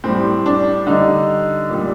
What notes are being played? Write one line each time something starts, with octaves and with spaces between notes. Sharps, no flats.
A2 G3 C4
D4
D3 G3 D#4
A#2 G3